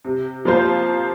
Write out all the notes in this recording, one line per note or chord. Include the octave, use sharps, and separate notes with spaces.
C3
F3 A#3 F4 C5